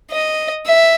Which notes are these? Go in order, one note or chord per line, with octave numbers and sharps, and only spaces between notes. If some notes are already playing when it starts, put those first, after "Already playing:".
D#5
E5